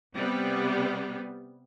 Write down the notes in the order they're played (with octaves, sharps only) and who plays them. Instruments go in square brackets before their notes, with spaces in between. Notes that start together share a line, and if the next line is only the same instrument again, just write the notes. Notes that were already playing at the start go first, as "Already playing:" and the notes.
[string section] C3 G3 B3